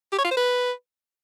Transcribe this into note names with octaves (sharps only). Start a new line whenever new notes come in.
G4
C#5
F4
C5
B4